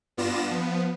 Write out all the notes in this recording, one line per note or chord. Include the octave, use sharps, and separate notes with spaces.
G2 B3 F4 D5 A#6 E7
F3 B3